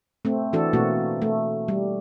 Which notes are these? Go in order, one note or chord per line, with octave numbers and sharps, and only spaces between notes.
A3 C4
E3 D4 F#4 A4
B2 A3 A#3 C4 F#4
A3
G3